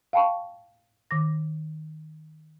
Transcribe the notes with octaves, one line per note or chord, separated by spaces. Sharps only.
F5 G5 A5 B5 C#6
D#3 D6 A#6